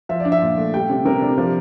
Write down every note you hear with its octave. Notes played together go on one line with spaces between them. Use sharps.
F3 E5
D5
D4
E5
A#2
A3
G3 G5
C3
C3 A#4
D4
F3